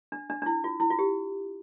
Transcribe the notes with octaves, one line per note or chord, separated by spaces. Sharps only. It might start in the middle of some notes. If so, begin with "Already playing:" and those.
D4
D4
D4
E4
F4
E4
F4
G4